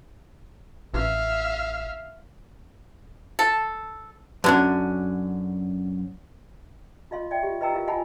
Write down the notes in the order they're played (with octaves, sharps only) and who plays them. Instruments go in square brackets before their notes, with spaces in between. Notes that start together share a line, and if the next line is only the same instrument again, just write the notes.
[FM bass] A1 [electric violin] E5 F5
[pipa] A4
[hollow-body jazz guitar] F#2 C#4 [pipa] D3 F#3 D4
[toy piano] F4 D#5 F5 C6
D5 E5 G5
F4 G4
F4 B4 D#5 G5 A#5 E6
E4 F4 G4 A#4 F5
F4 D#5 F#5 G#5 A5 B5